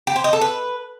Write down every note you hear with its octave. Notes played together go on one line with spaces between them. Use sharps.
G4
C5
D#5
A4
B4